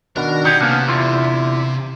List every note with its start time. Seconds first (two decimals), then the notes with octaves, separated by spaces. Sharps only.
0.16 B2 D#3 D4 F#4 A#4
0.45 D#4 G4 G#4 F#5
0.61 C3 A#3 B3 C#4 D4 F6
0.88 E2 D3 E4 F4